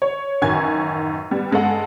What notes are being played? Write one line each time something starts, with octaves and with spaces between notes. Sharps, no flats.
C#5
A1 F#2 D#3 F#4 G#5 G#6
G3 B3
G2 G#3 A4 F#5